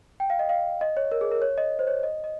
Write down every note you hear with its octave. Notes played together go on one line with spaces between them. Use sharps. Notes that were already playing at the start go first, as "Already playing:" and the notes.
G5
F5
D#5
F5
D#5
C#5
A#4
G#4
A#4
C#5
D#5
C5
C#5
D#5
D#5